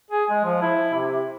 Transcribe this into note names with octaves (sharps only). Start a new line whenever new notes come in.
G#4
G#3
F3
E4
C3